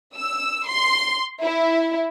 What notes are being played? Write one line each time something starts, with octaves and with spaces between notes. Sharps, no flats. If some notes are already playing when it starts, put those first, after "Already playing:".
E6
C6
E4